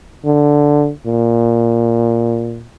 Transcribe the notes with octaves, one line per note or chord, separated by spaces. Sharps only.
D3
A#2